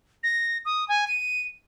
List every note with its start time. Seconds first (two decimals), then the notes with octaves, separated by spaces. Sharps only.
0.23 A#6
0.65 D#6
0.88 G#5
1.08 D#7